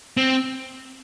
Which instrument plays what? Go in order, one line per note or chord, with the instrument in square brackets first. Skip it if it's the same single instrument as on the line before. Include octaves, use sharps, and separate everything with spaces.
[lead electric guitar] C4